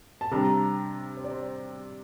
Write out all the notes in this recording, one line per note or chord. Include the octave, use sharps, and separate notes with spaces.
A5
C3 G3 D4 A#5
C5
D5
C5